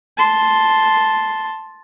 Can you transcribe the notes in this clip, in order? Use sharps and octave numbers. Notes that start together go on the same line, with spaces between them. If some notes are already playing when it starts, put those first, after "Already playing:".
A5 C6